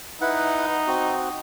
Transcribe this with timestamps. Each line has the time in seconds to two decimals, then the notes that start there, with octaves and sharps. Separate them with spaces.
0.21 D#4 E4 B4 F#5
0.87 C4 F#4